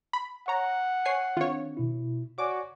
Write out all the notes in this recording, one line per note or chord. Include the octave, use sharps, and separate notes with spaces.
B5
C#5 F#5 A#5
C#5 G#5 C7
D#3 C4 D4 F4 C#5
B2 E4
F#4 C#5 D5 G#5 D6